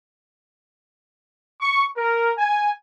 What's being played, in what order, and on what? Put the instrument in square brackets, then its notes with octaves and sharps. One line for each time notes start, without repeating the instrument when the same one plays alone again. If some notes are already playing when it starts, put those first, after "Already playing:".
[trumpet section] C#6
A#4
G#5